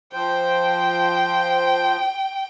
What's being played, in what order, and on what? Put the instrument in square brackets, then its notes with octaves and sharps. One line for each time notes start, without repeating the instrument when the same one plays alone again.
[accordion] F3 C5 [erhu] G5